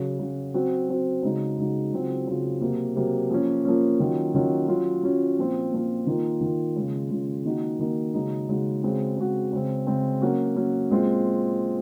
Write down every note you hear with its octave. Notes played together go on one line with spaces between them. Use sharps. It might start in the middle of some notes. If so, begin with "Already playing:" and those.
Already playing: C#3 F#3 C#4 F#4
C#3 F#3 C#4 F#4
F#3 C4 F#4
F#3 C4 F#4
C#3 G#3 D#4 F#4
C#3 G#3 D#4 F#4
C#3 F#3 C4 F4
C#3 F#3 C4 F4
C3 F#3 A#3
C3 F#3 A#3
F3 A#3 C#4
F3 A#3 C#4
D#3 F#3 C#4 F4
D#3 F#3 C#4 F4
F#3 C#4 F4
F#3 C#4 F4
A#2 F3 C4 F4
A#2 F3 C4 F4
D#3 A#3 F4
D#3 A#3 F4
C#3 G#3 C#4 F4
C#3 G#3 C#4 F4
D#3 A#3 D#4 F#4
D#3 A#3 D#4 F#4
C#3 G#3 D#4 F#4
C#3 G#3 D#4 F#4
C#3 G#3 C4 F#4
C#3 G#3 C4 F#4
C#3 G#3 C4
C#3 G#3 C4
F#3 A#3 C#4 F#4
F#3 A#3 C#4 F#4
A#2 G#3 C4 F4